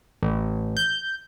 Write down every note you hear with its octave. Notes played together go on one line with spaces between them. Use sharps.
A1
G6